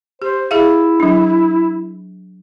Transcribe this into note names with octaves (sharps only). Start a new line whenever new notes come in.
G4 C5
E4 G#4 E5 F5
F#3 D4